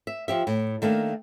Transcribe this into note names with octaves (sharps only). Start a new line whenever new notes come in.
E5
F3 G4 E5
A2
D#3 A3 A#3 D4